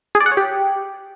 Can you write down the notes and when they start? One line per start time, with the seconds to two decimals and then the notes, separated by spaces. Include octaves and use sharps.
0.15 G#4
0.20 D5
0.26 F#5
0.32 C#5
0.37 G4